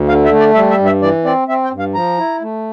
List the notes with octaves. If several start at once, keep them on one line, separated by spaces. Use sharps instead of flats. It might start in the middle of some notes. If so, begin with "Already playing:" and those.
Already playing: D2
D3 F5
E5
A3
D5
G3 E5
E5
G2
E5
E3 D5
C4 D5
C4 E5
G5
G2
F5
F3 A#5
E4
A3